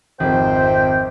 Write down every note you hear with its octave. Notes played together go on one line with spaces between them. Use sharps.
G#1 F2 C3 C5 G5